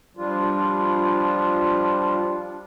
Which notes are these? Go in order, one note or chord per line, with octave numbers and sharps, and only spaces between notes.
F3 G3 D4 F4